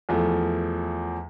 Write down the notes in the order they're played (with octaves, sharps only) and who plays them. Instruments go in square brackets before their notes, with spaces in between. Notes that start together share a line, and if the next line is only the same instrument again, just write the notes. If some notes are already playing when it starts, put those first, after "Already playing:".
[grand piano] E2 F3 A3